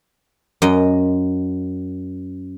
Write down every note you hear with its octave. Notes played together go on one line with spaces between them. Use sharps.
F#2 D#5